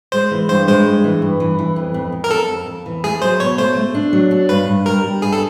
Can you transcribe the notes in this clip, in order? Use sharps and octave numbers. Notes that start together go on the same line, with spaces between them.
G#3 C5
E3
G2 C5
G#3 C5
G2
E3
G2
E3
E3
F2
F2
F2
A#4
F2 A4
F2
F2
E3
A3 G#4
F#3 C5
B2 C#5
A3 C5
A3
D4
F#3
D4
G2 B4
G2
G3 A#4
G3
G2 G#4
A4